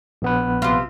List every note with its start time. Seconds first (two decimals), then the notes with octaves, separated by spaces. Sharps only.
0.22 A#1 B3 B4
0.62 C3 F4